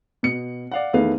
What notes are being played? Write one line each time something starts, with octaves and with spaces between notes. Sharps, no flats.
B2 C#7
D5 F5 F#5
E2 D#3 A3 B4 F5